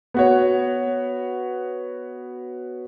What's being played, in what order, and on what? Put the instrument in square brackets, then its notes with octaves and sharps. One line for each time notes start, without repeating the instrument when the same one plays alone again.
[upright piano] B3 F#4 C#5